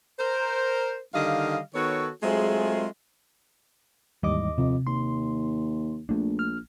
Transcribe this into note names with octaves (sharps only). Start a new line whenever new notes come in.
A#4 C5
D3 D#3 G3 D#5 F5
D#3 B3 F#4 A4 C#5
F#3 G#3 A3 C4 F4 G#4
D#2 G#2 E3 G3 D#5 D6
F2 C3
D#2 C6
A#1 A3 D4
F6